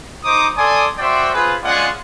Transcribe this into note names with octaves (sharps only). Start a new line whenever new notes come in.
D#4 C5 A#5 D6 D#6
A4 D5 G#5 C6 D6 D#6
F#4 C5 D5 E5 G5 C6
C4 F4 G#4 B4
G#3 C#4 F4 G#4 D5 F#5